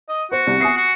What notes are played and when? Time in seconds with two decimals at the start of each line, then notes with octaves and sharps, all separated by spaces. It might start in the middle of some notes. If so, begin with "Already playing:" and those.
0.09 D#5
0.32 F#4 C5
0.47 C2
0.61 G#5 D#6 C7
0.77 F#4